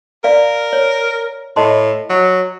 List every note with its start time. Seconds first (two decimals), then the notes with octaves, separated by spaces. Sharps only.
0.24 A#4 D5 F5
0.73 C#5
1.56 A2 D#5 A5 C6
2.10 F#3